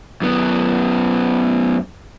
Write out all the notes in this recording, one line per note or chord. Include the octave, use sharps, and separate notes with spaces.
F#2 B3